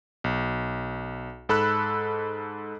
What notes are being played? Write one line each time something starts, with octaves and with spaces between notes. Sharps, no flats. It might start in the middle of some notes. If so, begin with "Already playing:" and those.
B1
G#2 A4 B5 E6 F#6